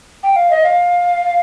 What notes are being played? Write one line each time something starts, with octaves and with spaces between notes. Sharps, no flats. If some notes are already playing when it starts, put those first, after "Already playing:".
G5
F5
D#5
F5